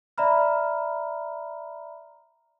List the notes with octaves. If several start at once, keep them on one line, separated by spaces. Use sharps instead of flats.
D5 E5 A#5 B5 F6